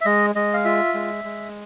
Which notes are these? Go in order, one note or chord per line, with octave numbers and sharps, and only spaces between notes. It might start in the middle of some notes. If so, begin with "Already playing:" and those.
E5
G#3 D#5
G#3 D#5
F5
F4 E5
G#3
G#3